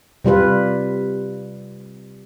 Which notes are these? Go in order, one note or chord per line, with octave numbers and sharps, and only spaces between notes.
C3 G3 F4 B4